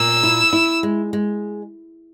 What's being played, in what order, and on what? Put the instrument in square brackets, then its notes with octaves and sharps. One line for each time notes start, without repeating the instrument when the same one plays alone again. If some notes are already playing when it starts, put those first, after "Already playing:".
Already playing: [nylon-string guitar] A#2 [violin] E6
[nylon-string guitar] E4
E4
G#3
G#3